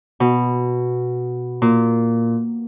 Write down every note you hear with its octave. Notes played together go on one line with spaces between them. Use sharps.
B2
A#2